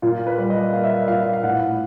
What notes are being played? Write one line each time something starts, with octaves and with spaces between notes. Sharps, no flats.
A#2 F4
B4
G3
D#5
A#3 F5
E5
F5
A#2 F5
F5
A2 F#5